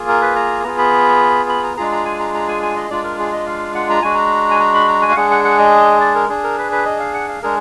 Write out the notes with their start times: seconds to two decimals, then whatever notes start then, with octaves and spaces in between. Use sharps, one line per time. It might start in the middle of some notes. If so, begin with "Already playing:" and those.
Already playing: A#3 F4 G#4
0.08 A#4
0.21 B4
0.36 A#5
0.63 B3 F4 G#4 A#5
0.78 B5
1.49 B5
1.63 A#5
1.77 G#3 D4 F4 G#4 A#5
1.92 A#5
2.05 G#5
2.20 A#5
2.34 A#5
2.48 G#5
2.62 G#5
2.76 D#5
2.90 G#3 D4 F4 D5
3.04 A#4
3.19 G#4
3.32 D#5
3.46 F5
3.75 F#5
3.90 A#5
4.02 G#3 D4 F#4 G#5
4.15 A#5
4.51 G#5
4.60 A#5
4.74 B5
4.89 A#5
5.02 G#5
5.11 F5
5.16 G#3 D4 G#4 F#5
5.31 F#5
5.44 F#5
5.59 D#5
6.01 D5
6.15 A#4
6.29 D4 G#4
6.44 A#4
6.58 B4
6.72 B4
6.86 D#5
7.00 F5
7.14 F#5
7.29 F5
7.43 G#3 D4 G#4 A#4